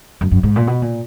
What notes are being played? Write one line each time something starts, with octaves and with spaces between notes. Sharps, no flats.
F#2
F#2
G#2
A#2
B2
A#2